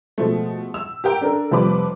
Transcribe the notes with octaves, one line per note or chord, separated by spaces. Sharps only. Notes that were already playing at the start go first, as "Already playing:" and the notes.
B2 F3 G#3 A3
E6
G4 A#4 G5
D4 A4 A#4
F1 F3 G3 B4 B5 D6